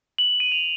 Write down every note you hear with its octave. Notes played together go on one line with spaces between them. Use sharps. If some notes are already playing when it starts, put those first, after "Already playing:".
F#7
D#7
F7